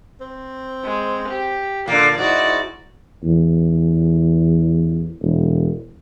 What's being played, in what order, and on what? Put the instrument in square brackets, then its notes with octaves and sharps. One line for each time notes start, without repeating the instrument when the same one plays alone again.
[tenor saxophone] C4
[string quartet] G#3
G4
[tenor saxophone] A#2 [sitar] D3 A#3 [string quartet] A6
[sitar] G#2 [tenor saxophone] D#4 [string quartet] E4 F#4 D5
[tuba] E2
E1